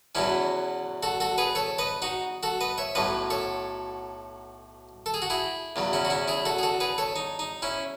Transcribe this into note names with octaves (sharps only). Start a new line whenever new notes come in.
E2 B2 F#3 C#4 E4
F#4 A4
F#4 A4
G#4 B4
A4 C#5
B4 D#5
D#4 F#4
F#4 A4
B4 D#5
C#5 E5
B1 A2 F#3 B4 D#5
A4 C#5
A4
G#4
F#4
E4 G#4
E2 C#3 F#3
C#4 E4
F#4
C#4 E4
E4 G#4
F#4 A4
G#4
F#4 A4
G#4 B4
A4 C#5
D#4
D#4
C#4 E4